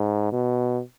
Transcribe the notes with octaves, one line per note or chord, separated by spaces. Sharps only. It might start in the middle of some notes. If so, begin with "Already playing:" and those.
Already playing: G#2
B2